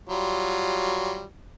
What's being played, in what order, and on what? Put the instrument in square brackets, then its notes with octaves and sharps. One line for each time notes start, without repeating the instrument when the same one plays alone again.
[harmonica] F#3 G3 F4